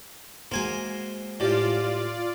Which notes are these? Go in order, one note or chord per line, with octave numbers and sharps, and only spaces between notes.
G#3 A#3 F#4 C5 G#5
A2 F4 G4 D5